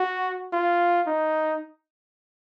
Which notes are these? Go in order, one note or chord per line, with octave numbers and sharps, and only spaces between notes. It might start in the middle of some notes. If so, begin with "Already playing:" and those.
Already playing: F#4
F4
D#4